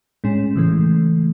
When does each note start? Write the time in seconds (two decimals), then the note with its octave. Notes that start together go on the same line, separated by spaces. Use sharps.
0.24 A2 G#3 C#4
0.55 C#3 E3 A3